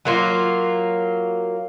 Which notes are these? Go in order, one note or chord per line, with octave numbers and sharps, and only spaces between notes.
F#3 A#3 F4